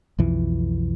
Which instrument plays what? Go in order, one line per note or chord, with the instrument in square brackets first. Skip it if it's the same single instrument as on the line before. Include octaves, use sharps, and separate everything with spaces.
[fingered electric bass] B1 F2 E3